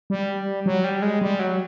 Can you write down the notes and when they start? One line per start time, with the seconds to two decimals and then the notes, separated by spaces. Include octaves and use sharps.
0.10 G3
0.66 F#3
0.84 G3
1.02 G#3
1.22 G3
1.39 F#3